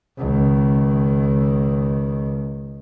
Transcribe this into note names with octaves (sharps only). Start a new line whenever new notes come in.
C#2 D#3